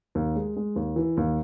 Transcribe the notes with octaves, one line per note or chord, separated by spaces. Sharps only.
D#2
G#3
G#3
D#2
E3
D#2